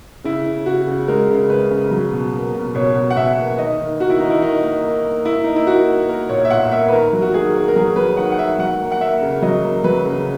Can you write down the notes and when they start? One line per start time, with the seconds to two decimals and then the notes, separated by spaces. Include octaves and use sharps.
0.24 C#3 E4
0.46 C#3
0.66 C#3 F#4
0.87 C#3
1.08 G#3 A#4
1.30 C#3
1.50 G#3 B4
1.71 C#3
1.91 F#3
2.12 B2
2.33 A#3
2.55 B2
2.75 B2 C#5
2.96 B2
3.10 F#5
3.17 B2 E5
3.37 A#3
3.58 D#3 D#5
3.79 D#3
4.00 A#3 F#4
4.10 E4
4.20 D#3 D#4
4.30 E4
4.42 D#3 D#4
4.63 A#3
4.84 A#3
5.05 A#3
5.25 A#3 E4
5.44 A#3 D#4
5.56 E4
5.67 A#3 F#4
5.88 A#3
6.09 A#3 A#4
6.29 A#2 C#5
6.45 E5
6.50 A#2 F#5
6.72 A#3 E5
6.88 B4
6.92 D#3 A#4
7.13 F#3
7.22 F#4
7.34 D#3 G#4
7.55 A#3
7.68 A#4
7.76 F#3 G#4
7.96 F#3 B4
8.17 D#3 F#5
8.32 F#5
8.38 D#3 E5
8.59 F#3 F#5
8.81 A#3
8.92 F#5
9.01 A#3 E5
9.22 C#3
9.42 F#3 D#5
9.64 A#3
9.84 F#3 B4
10.05 C#3